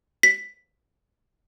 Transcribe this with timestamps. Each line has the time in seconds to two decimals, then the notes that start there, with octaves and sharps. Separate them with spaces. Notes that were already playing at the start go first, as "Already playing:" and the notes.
0.23 B6